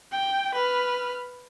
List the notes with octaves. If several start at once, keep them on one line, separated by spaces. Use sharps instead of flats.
G5
B4 F6